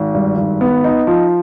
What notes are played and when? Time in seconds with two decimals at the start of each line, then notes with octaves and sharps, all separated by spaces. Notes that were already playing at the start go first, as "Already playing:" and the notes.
Already playing: G#1
0.14 G2
0.37 G#1
0.61 B3
0.84 D#4
1.07 F3